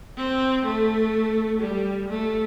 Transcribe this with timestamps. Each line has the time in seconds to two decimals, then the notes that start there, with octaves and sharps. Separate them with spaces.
0.18 C4
0.66 A3
1.60 G3
2.09 A3